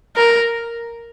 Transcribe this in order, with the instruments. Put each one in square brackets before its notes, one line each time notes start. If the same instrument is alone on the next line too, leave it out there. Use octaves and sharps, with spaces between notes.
[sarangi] A#4